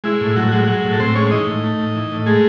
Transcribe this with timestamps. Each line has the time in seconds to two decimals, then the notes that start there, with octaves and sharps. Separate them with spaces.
0.04 G#3 E4
0.21 A2
0.36 A2 F#3 F#4
0.52 F#3 G#3 F#4
0.67 F#3 G#3 F#4
0.84 A2
0.93 A4
1.00 A2 C4 C5
1.15 G#3 C#4 C#5
1.31 E3 D#4 D#5
1.47 A2
1.64 A3
1.79 A2
1.95 E3
2.12 A2
2.26 G#3 A3 G#4